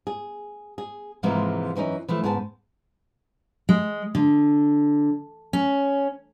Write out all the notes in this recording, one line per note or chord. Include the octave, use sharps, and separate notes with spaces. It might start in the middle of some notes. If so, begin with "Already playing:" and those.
G#4
G#4
G#2 C3 E3 F3 G#3 A#3
F#2 E3 C#4 D#4
E3 F3 A3
G#2 C#3 B3 G#5 A5
G#3
D3
C#4